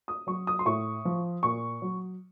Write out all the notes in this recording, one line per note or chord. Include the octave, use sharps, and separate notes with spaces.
D#6
F#3 C#6
D#6
C6
A2 C#6
F3
A#2 C#6
F#3